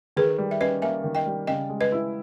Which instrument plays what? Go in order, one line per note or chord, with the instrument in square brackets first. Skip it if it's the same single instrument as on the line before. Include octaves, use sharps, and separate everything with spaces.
[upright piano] D#3 [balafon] G#4 B4
[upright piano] G3
[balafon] E5
[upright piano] C#4 [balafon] B4 D#5
[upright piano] A#3 [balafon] E5 G#5
[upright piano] D#3
[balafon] D#5 G5
[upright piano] G3
[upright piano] C#3 [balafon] D#5 G5
[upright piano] G#3
[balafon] B4 D#5
[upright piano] E4